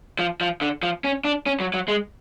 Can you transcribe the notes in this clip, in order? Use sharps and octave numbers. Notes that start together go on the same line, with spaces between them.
F3
F3
D3
F3
C#4
D4
C#4
F#3
F#3
G#3